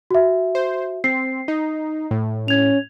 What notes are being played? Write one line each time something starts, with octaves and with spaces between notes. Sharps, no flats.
F#4 E5
C5
C4 C7
D#4
A2
C#4 G#6 F7